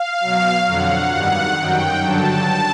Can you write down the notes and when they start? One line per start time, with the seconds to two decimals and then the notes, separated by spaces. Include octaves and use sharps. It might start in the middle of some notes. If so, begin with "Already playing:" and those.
Already playing: F5
0.20 B2 F#3
0.65 F2 D3 F#3 F#5
1.11 G2 D#3 G3 F#5
1.56 F#2 D#3 F#3 G5
2.02 G2 D3 F#3 A5